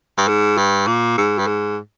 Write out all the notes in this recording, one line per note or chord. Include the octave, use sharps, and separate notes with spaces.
G2
G#2
G2
A#2
G#2
G2
G#2